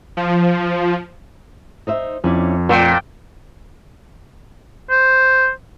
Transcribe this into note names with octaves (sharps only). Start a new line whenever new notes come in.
F3
D#4 C5 E5
F2 C#4 E4 D5
A#2 A3 G5
C5